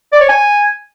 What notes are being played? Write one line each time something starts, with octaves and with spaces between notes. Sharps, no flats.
D5
C#5
G#5